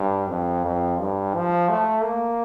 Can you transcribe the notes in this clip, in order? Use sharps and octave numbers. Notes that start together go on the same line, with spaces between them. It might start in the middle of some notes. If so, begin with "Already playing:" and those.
Already playing: G2
F2
F2
G2
F3
A3
A#3